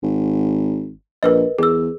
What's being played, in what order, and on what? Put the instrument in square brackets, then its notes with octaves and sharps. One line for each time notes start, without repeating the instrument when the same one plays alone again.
[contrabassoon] G#1
[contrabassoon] A#1 [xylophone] A#4 B4 D#5
[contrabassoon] E2 [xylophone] G#4 E6